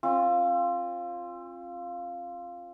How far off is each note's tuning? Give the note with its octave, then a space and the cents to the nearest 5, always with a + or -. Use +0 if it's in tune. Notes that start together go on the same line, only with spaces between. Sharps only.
C4 +40 F4 +0